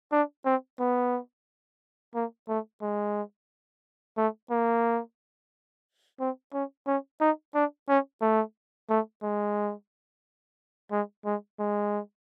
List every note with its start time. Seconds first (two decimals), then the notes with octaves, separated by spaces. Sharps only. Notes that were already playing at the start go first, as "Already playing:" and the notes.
0.12 D4
0.45 C4
0.79 B3
2.15 A#3
2.48 A3
2.82 G#3
4.17 A3
4.50 A#3
6.20 C4
6.53 C#4
6.87 C#4
7.20 D#4
7.54 D4
7.89 C#4
8.21 A3
8.90 A3
9.23 G#3
10.91 G#3
11.25 G#3
11.59 G#3